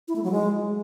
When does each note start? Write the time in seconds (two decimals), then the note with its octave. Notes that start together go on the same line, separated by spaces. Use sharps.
0.08 E4
0.16 A3
0.23 F#3
0.31 G#3